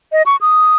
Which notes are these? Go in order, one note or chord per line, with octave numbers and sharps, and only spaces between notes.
D#5
C#6
D#6